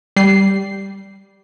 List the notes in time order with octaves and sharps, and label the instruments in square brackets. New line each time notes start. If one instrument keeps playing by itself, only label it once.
[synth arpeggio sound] G3 C7